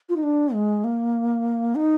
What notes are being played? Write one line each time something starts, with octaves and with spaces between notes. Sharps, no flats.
F4
D#4
D4
G#3
A#3
D#4